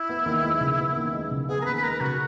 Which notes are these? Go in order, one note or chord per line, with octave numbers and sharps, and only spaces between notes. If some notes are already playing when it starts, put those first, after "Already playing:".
Already playing: E4
B3
D#2
G#3
C#3
B3
D#2
G#3
C#3
B3 G#4
A#4
D#2 B4
B4
G#3 A#4
C#3 F#4